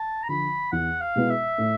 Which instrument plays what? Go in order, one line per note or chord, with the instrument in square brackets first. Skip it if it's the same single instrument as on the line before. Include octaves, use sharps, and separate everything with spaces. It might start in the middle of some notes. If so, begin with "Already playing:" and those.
Already playing: [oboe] A5
A#5
[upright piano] D3 F3 [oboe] B5
[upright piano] E2 [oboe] F#5
[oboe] F5
[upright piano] B2 G#3 B3 E4
[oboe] E5
[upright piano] A2